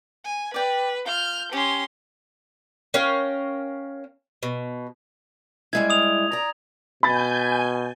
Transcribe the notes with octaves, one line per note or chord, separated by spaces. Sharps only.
G#5
B4 D5 G5
F4 F6 G6
C#4 G4 C6
C#4 A#4 F5 G5
B2
G3 G#3 E4 G#6
D#6 F7
D5 A#5
B2 G#5 B5 G6 A6